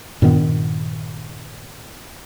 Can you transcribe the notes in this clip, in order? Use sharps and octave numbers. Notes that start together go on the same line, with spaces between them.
G2 A#2 D#3 B3